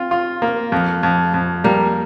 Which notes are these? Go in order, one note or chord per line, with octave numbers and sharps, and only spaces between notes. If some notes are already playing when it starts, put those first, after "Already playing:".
Already playing: C4 F4
F4
A#3
F2
F2
F2
G3 A#3